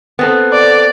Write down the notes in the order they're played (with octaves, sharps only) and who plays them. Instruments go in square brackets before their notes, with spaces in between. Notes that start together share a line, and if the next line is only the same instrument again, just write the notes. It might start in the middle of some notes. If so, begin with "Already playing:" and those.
[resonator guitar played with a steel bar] B3 C4 A4
[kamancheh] D5